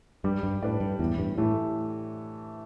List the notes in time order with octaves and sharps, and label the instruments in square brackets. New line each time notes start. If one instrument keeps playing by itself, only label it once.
[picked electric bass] G2 [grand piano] G3
[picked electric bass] G2
[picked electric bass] A2 [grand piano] D4 B4 D5
[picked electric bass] G2
[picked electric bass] E2 [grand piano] A2
[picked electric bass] G2
[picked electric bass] A2 [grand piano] E3 A3 G4